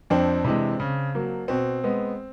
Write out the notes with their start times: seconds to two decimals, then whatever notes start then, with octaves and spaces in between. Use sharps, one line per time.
0.10 F2 C4 D4
0.44 C3 E3 G#3
0.80 C#3
1.15 F#3 A#3
1.48 B2 C4
1.83 G#3 B3